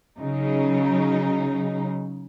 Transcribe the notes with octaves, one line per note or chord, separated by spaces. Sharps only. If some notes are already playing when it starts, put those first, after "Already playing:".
C#3 F#3 D#4